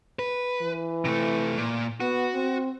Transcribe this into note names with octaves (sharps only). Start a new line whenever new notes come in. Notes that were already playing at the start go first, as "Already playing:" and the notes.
B4
E3
C3 A3
A#2
B3 F#4
C4